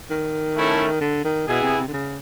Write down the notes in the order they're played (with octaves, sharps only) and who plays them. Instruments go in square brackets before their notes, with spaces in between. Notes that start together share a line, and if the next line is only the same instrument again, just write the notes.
[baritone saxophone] D#3
[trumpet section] A3 C#4 E4 A4
[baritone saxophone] D3
D#3
[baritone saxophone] B2 [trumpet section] B3 E4 G#4
[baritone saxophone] C3
C3
D3
C#3